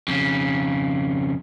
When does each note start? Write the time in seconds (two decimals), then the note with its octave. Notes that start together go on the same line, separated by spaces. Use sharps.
0.08 F2 C#3